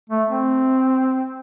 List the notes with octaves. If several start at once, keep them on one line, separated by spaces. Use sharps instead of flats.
A3
C4